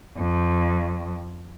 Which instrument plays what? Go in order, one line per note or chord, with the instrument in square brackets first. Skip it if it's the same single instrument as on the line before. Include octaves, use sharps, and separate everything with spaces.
[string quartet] F2